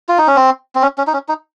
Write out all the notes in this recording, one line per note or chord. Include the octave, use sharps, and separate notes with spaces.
F4
D#4
C#4
C4
C4
C#4
C#4
D#4
C#4
D#4